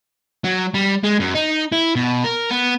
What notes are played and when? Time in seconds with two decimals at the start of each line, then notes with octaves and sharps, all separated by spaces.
0.45 F#3
0.74 G3
1.03 G#3
1.20 F#2
1.34 D#4
1.72 E4
1.96 B2
2.24 A#4
2.50 B3